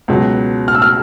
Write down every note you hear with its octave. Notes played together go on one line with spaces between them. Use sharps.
C#2 B2 F#3
F6
E6
F6